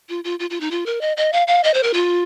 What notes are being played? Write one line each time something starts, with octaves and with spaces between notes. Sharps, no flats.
F4
F4
F4
F4
D#4
F4
A#4
D#5
D#5
F5
F5
D#5
C5
A#4
F4